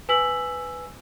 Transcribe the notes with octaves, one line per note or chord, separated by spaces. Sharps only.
B4 G#5 E6 B6 F#7